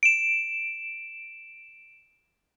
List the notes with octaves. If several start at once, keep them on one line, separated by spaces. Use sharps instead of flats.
D7 E7